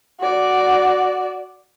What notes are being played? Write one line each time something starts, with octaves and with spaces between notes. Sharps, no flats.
F#4 D5